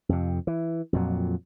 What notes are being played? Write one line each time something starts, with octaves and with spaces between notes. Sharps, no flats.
F2 C3
E3
F2 A#2 F#3